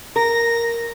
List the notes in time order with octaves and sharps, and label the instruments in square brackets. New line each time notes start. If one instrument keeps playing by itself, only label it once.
[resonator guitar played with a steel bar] A#4 [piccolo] A#6